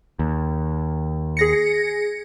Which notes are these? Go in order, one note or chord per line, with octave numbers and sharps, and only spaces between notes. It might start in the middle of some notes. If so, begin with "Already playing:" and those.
D#2
G#4 A#6 C#7